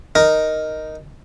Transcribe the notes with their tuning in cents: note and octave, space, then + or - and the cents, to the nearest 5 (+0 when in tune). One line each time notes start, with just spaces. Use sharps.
D#4 +0 A#4 +0